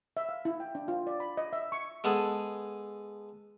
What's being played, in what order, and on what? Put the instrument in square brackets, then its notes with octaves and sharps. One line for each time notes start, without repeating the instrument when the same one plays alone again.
[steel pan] E5
F5
E4
G5
D4
F4
D5
B5
D#5
E5
C#6
[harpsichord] G#3 B3 G#4 A4